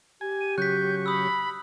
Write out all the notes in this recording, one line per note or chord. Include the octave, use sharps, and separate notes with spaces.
G4 G#5
D#7
C#3 F#3 C#6 F#6 G6 B6
B5 D#6 E6